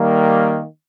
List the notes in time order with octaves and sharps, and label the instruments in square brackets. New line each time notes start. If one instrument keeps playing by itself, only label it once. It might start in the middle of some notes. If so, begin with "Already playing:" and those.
Already playing: [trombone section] D#3 G3 A#3